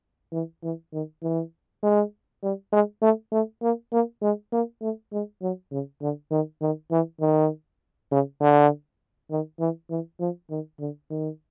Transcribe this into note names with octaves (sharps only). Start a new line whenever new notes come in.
E3
E3
D#3
E3
G#3
G3
G#3
A3
A3
A#3
A#3
G#3
A#3
A3
G#3
F#3
C#3
D3
D#3
D#3
E3
D#3
C#3
D3
D#3
E3
E3
F3
D#3
D3
D#3